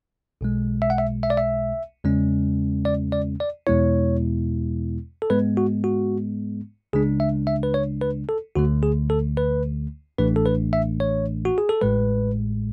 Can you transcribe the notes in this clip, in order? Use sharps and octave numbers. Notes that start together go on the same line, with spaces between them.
B1 B2 G#3
E5
F#5
E5
E5
D5
E5
E2 C#3 G#3 C#4
D5
D5
D5
E2 B2 G#3 B3 E4 C#5
A4
G#2 G#3 B3 B4
F#4
F#4
C#2 C#3 G#3 D4 G#4
E5
E5
B4
C#5
B4
A4
D2 D3 A3 F#4
G#4
A4
B4
A1 A2 E3 A3 D4 B4
A4
B4
E5
C#5
F#4
G#4
A4
A1 A2 G#3 B4